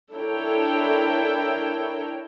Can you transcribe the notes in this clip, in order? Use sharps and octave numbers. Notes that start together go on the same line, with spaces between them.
D4 E4 A4 A#4 C#5 G5